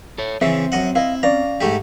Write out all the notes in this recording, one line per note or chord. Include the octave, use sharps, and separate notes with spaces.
A4 C#5
C#3 E3 C4 E5
F#2 D#5 F#5
E4 D#5 F5
C#4 D5 F5 A#5
G#2 A3 G4